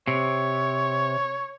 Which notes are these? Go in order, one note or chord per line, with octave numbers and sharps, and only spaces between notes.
C3 C#5